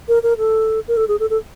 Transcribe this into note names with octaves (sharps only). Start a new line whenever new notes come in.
A#4
A#4
A4
A#4
A4
G#4
A4
A4